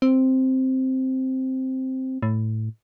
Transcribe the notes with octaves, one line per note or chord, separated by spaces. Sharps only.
C4
A2